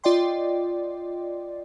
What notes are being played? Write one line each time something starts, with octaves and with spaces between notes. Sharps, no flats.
F4 D5 D#5 G5 C6